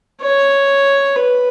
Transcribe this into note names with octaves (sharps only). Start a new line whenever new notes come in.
C#5
B4